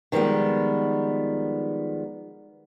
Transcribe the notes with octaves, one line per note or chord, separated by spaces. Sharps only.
D#3 F3 G3 G#3 B3